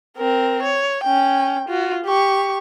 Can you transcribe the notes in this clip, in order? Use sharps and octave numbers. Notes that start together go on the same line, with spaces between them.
C4 A#4
C#5
C#4 G5
F4 F#4
G4 C#6